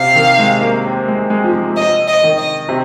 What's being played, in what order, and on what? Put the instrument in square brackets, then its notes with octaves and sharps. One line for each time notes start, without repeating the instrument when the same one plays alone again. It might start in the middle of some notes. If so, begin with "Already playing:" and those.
Already playing: [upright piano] C3 [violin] F5
[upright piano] D#3
G#3
A#3
C4
G#3
G#3
F3
G#3
[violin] D#5
D#5
[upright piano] D#3
[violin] D#5
[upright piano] C3